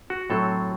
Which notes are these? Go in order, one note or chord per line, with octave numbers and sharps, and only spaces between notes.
F#4
A2 F#3 C4 A4